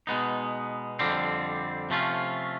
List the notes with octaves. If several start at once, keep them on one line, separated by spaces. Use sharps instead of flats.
B2 G#3 B3 D#4
F2 D3 G3 C4
C3 F3 A3 C#4 F4